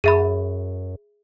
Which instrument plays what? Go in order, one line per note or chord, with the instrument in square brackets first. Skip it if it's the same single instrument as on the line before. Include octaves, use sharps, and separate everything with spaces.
[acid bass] F#2 [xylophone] G#4 E5 B5